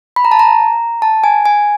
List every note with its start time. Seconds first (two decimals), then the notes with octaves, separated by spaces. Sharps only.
0.16 B5
0.25 A#5
0.31 A5
0.39 A#5
1.02 A5
1.24 G#5
1.46 G#5